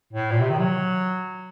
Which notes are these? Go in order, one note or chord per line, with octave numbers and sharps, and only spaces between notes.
A2
A#2
C3
D#3
F#3